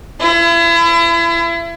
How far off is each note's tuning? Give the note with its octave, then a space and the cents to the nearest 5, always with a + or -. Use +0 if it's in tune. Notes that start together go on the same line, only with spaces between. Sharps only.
E4 +35